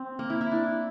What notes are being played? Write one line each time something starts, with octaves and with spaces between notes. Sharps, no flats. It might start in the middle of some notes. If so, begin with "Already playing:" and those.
Already playing: C4
A#3
E4
E4
D4